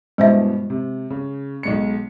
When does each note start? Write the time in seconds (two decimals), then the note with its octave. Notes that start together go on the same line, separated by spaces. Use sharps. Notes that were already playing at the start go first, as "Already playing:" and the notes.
0.18 G2 B2 E3 G#3 C5 E5
0.70 C3
1.10 C#3
1.63 B1 G#3 C#7